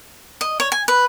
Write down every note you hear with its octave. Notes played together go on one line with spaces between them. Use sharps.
D#5
C#5
G#5
B4